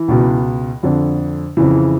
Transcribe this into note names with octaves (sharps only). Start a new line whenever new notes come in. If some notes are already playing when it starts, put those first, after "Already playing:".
Already playing: E3
C#2 B2
F2 D3
F2 C#3 E3